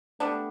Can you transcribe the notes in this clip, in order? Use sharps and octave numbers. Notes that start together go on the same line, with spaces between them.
G3 A3 B3 D4